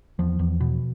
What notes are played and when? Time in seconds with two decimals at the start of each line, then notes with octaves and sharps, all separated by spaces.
0.19 E2 F3
0.39 E2
0.61 B2